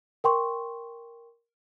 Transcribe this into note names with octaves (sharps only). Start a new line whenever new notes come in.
A#4 G5 C6 C#6